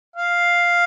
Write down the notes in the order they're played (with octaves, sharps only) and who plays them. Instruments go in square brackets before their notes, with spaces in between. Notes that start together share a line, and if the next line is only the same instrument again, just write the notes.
[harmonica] F5